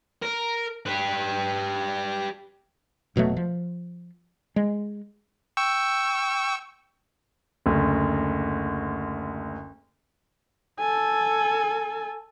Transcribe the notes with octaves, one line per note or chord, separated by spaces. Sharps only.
A#4
G4 B4
F1 B2 F#3 A3
F3
G#3
G5 C#6 E6
F#1 D2
A4 G#5